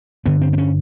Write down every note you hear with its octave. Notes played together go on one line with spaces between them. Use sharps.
G2 D3 B3
C4
C4
C#4